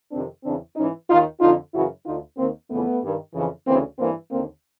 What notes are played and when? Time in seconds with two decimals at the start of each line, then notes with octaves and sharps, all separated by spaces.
0.11 F2 C3 D#3 C4 D4
0.44 E2 C#3 E3 C4 D4
0.76 G#2 E3 C#4 D#4
1.08 D#2 D#3 D#4 F4
1.41 F2 D3 D#4 F4
1.73 F#2 C#3 E3 E4 F#4
2.05 D2 D3 D#4 F4
2.37 D#2 D#3 A#3 C4
2.70 F2 C#3 E3 A3 B3
3.02 G2 D#3
3.34 F2 C#3 E3
3.66 D2 C#3 E3 A#3 C4
3.98 G2 E3 A#3 C4
4.31 D#2 D3 A#3 C4